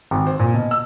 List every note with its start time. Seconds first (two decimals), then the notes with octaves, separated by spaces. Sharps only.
0.11 G#1
0.27 C5
0.39 A#2
0.54 B2
0.71 E6